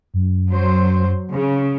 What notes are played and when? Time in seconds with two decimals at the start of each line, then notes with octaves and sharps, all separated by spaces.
0.14 F#2
0.49 F#3 C5
1.32 C#3